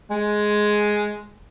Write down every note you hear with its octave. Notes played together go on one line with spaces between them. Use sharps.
G#3